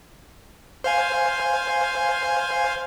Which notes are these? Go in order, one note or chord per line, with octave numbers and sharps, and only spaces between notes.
C5 F5 G#5